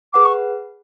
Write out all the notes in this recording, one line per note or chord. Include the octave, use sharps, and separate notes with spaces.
G#4 B4 F#5 D6
C#6